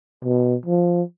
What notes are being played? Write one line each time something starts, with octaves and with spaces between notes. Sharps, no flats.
B2
F3